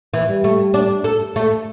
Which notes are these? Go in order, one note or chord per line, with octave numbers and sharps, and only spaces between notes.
E3
G3
A3
D4
A4
A3